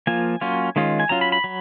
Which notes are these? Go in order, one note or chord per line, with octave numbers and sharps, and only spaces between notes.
F3 A#3 F4 G#5
F#3 A#3 C#4 F4
D#3 G#3 C#4 F4
G#5
F#3 C#4 F4 A#5
B5
B5
F#3